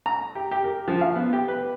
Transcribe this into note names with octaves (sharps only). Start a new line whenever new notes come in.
A#5
G4
G4
A#4
F3
F5
B3
G4
B4